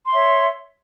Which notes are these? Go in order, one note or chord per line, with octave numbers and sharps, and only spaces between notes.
C#5 E5 C6